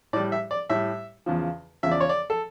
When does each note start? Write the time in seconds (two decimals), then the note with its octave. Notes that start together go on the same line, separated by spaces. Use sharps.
0.13 A2 D5
0.16 G3
0.32 E5
0.51 D5
0.69 A2 G3 E5
1.26 E2 C#3 F3
1.83 E2 C#3 F3 E5
1.91 D5
2.00 C#5
2.09 D5
2.30 A4